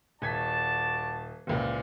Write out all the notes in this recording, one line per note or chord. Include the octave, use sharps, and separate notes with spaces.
D#1 F#4 D5 A5 G#6 B6
F#1 C#2 A#2